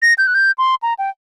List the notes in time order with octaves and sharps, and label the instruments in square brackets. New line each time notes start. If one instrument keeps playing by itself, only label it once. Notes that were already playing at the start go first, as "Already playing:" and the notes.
[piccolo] A#6
G6
F#6
G6
C6
A#5
G5